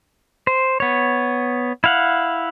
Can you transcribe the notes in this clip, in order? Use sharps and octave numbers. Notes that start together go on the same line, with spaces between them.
C5
B3 C#5
E4 F5 F#5